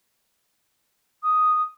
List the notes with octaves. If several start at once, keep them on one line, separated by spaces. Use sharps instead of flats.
D#6